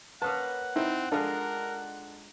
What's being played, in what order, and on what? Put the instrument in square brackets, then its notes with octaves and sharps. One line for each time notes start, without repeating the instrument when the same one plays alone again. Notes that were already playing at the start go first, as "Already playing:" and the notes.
[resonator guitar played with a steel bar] A#3 C#4 B4 [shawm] F#5 [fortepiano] A5 D#6
[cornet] C4 [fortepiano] D#4 E4
[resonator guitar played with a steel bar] G#3 D#4 F4 [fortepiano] D4 A4 [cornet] A#4